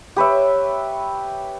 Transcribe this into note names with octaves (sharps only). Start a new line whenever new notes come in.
G4 B4 C#5 E5